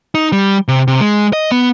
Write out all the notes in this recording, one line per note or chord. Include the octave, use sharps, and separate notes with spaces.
D#4
G3
C3
C3
G#3
D#5
B3